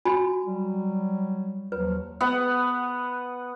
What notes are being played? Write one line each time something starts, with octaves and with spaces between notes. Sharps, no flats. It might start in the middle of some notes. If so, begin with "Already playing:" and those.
F#4 G#5 B5
F#3 G3
D#2 F3 F#3 B4
B3 F#5